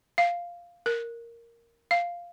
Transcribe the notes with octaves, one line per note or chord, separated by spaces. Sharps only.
F5
A#4
F5